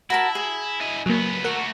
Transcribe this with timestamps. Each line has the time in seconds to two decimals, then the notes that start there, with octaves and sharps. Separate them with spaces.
0.10 E4 F#4 A#4 A5
0.35 G#4
0.81 E4 D#5
1.06 C#2 F#3 A#3 B3
1.44 A3 F#4 A#4 F#5